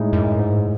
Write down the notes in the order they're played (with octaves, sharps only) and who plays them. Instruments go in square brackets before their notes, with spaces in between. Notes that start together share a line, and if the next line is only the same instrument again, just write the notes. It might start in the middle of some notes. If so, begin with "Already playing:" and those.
Already playing: [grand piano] A2 G#3 D#4
[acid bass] F#2
G#2